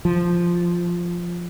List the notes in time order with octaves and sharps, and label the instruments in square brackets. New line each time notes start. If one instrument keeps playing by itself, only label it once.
[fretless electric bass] F3